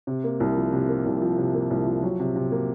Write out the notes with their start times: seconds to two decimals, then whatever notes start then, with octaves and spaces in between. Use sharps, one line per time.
0.07 C3
0.24 A#3
0.40 C2
0.56 F3
0.73 C3
0.89 A#3
1.06 C2
1.22 F3
1.38 C3
1.55 A#3
1.70 C2
1.86 F3
2.03 F#3
2.20 C3
2.36 C3
2.52 A#3